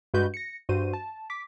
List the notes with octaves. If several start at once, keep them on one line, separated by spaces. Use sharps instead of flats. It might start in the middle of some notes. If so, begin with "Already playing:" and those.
G2 G#3 F#4 B4 G6
A#6 C#7
G2 F#4 C5 D#7
A5
D6 B6